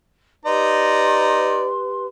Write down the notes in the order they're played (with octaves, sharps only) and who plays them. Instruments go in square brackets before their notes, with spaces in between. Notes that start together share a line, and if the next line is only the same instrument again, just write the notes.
[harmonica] D#4 D5 A#5 [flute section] G4 B4 C6